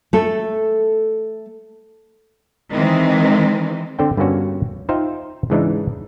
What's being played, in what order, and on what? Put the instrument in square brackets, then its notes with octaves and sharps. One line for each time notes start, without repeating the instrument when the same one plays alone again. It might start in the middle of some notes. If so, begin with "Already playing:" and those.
[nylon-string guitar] A3 A4
[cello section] D#3 E3 G#3 C4
[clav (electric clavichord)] D3 C4 D4 A4 C5 G5
G2 D3 A#3 B3 C#4 F#4
D#4 F4 C5 E5 F5 G5
G#2 C#3 E3 G#3 D4 D#4